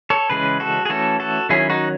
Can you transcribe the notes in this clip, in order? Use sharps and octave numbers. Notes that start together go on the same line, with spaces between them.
A4 C#5
C#3 E3 G#3 C#4 G#4 B4
F#4 A4
G#4
E3 A3 C#4 F#4 A4
F#4 A4
D#3 F#3 C#4 E4 G#4
D#4 F#4